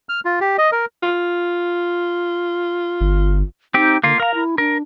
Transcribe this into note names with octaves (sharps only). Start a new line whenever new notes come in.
F6
F4
G4
D#5
A#4
F4
G1
C4 D#4 G4
D3 A#3 F4
A#4 F5 A#5
E4
D4 A#4